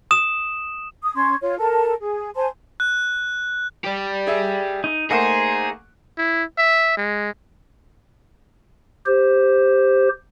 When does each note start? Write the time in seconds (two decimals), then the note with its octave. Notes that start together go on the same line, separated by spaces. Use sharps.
0.11 D#6 E7
1.03 D#6
1.16 C#4 C6 C#6 G#6
1.41 F4 C#5
1.58 A4 A#4 A5
2.00 G#4
2.36 C5 G#5 A5 C6
2.80 F#6
3.84 G4 D5
4.27 G#4 E5
4.84 D#4
5.11 A3 A#3 D#4 G#4 C5 F#5
6.18 E4
6.58 E5
6.97 G#3
9.06 G4 C5